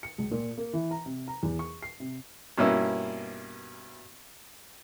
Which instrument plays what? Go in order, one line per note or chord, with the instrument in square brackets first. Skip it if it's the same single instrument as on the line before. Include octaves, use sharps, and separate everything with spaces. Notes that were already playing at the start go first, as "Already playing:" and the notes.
[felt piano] C#7
C#2
A#2
A#3
E3
A#5
C3
A#5
E2
C#6
C7
C3
[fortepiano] G2 B2 A#3 C#4 E4 E6